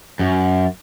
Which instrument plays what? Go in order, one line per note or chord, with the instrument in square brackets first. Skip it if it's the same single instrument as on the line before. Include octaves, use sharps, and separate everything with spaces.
[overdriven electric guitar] F#2